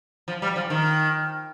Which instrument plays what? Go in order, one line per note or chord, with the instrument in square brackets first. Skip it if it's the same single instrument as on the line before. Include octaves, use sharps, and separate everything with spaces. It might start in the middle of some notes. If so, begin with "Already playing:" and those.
[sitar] F3
G3
F3
D#3